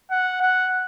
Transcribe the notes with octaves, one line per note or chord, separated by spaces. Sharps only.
F#5
F#5